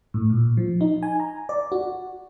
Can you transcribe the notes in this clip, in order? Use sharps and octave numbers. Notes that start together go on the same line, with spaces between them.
A2
A#2
F3
D#4
G#5
A#5
D5
F#4